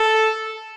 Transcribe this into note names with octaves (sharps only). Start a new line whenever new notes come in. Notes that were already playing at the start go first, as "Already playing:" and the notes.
Already playing: A4